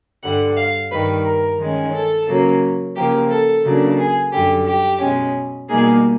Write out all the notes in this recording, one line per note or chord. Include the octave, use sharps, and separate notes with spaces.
G2 D3 G3 F#5
F5
G2 D#3 G3 B4
A#4
D#3 G#3 C#4
A4
C#3 F#3 A#3 C#4
C#3 F3 A#3 G4
A4
C#3 F#3 A#3 D4
G#4
F#2 D3 G3 G4
G4
B2 G#3 C#4
B2 G3 A#3 D#4 G#4